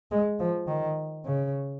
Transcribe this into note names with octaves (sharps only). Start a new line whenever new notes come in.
G#3
F3
D#3
C#3